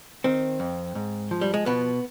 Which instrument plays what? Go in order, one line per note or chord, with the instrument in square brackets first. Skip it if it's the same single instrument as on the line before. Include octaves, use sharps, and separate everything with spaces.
[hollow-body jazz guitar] D#3 C4
F2
G#2
F3
G3
G#3
B2 B3